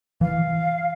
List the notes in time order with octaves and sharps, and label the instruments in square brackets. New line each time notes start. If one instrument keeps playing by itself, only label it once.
[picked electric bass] E3 [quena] F5